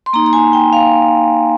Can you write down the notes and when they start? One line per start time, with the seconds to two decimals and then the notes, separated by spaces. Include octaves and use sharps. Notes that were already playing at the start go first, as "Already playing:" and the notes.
0.06 C6
0.13 A#3 D#4 A#5
0.26 A#5
0.33 G#5
0.53 G5
0.73 F5